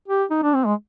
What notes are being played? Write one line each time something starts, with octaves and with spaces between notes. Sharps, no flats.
G4
D#4
D4
C4
G#3